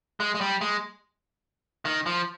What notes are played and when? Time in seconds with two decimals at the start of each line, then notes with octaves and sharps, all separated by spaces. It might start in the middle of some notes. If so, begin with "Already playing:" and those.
0.20 G#3
0.35 G#3
0.41 G3
0.61 G#3
1.85 D#3
2.06 F3